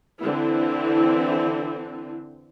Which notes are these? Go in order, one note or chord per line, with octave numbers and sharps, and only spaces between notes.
D3 E3 C4 E4